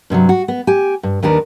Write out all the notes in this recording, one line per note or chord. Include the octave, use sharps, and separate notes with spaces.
G2 C3 E3 F#3
F#4
B3
G4 G#5
G2
D#2 D#3 D4 A#4 B4